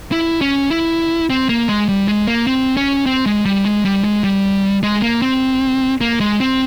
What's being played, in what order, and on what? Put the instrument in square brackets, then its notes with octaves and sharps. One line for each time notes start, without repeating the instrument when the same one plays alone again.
[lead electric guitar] E4
C#4
E4
C4
A#3
G#3
G3
G#3
A#3
C4
C#4
C4
G#3
G3
G#3
G3
G#3
G3
G#3
A#3
C4
A#3
G#3
C4